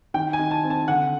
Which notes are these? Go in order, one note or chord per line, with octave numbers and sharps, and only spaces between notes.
D#3 G5
G#5
D#3
A5
C4
A5
D3 F#5